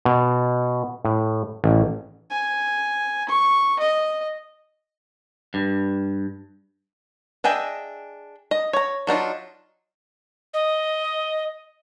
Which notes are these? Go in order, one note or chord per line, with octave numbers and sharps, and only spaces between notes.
B2
A2
A1
G#5
C#6
D#5
G2
D4 G#4 D#5 E5 G5
D#5
C#5 A#5
F#3 D4 D#4 F4
D#5